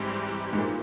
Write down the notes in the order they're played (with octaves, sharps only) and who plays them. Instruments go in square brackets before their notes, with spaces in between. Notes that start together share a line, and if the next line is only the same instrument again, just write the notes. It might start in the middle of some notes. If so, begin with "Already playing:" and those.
Already playing: [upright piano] G#2 [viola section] E3 G3 C4 E4 G4
[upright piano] G#2
A#2